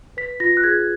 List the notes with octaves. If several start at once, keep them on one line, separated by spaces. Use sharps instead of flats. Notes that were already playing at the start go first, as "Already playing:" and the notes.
B4 B6
F4 A#6
F#6
G#4 G#6